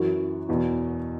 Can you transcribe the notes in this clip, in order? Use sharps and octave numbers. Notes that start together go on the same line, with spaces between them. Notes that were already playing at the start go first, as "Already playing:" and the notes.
Already playing: F#2 E3 F#4
E2 B2